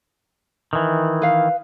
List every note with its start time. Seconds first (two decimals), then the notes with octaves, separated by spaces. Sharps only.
0.73 D#3 E3
1.22 B4 F5